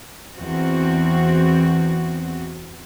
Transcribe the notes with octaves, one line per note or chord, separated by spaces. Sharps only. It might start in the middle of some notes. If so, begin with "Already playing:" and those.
E2 C4 F#4